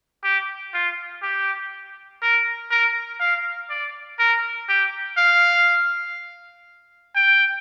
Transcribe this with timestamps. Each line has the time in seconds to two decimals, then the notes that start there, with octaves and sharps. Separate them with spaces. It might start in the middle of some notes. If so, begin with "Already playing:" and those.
0.24 G4
0.74 F4
1.22 G4
2.22 A#4
2.71 A#4
3.20 F5
3.70 D5
4.19 A#4
4.69 G4
5.17 F5
7.16 G5